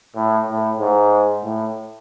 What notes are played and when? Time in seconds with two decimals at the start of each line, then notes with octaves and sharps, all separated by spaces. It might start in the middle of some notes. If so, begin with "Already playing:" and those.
0.15 A2
0.48 A2
0.80 G#2
1.44 A2